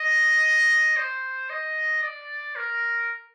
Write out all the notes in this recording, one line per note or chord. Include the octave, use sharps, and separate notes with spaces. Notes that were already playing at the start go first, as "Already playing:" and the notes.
Already playing: D#5
C5
D#5
D5
A#4